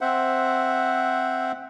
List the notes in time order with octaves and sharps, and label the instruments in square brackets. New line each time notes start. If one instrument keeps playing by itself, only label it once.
[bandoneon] C4 C5 E5 F#5